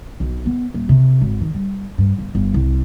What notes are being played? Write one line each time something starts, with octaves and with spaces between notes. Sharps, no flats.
B1
B3
D#1
C3
G#1
D#3
G3
G2
G1
G1
C2